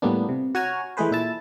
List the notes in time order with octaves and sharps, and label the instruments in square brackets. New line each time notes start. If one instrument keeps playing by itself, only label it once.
[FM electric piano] A2 G3 A#3 B3 D4
C3
F#4 C#5 G#5 A#5 F6
E3 G#3 A3 G#4 B4 C5
A#2 E4 A5